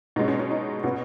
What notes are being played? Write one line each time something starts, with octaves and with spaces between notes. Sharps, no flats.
B2 G#3 C#4 D#4
C#4
C#4
D#4
B2 B3 C#4 F#4